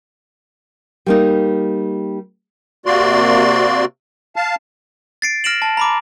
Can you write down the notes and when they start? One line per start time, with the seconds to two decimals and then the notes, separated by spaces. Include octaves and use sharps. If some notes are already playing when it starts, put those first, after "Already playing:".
1.06 G3 A#3 D#4
2.86 C3 A#3 F#4 D5 C6
4.36 F5 A5
5.22 A6 C7 D7
5.44 F6 A#6 D7 E7 F#7
5.62 A5
5.77 A#5 B5 D6